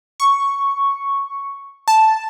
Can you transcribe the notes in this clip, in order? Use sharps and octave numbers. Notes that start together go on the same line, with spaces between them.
C#6
A5